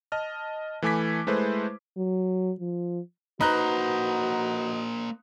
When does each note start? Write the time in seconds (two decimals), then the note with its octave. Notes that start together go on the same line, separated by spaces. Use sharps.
0.12 D#5 A5 F6
0.82 E3 A3 G#5 D6 G#6 B6
1.27 G#3 A3 E4 B4 C5
1.97 F#3
2.60 F3
3.41 A#3 D#4 F#4 B4 C5 A#5 B5 F#6